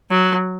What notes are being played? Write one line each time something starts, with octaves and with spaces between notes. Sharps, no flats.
F#3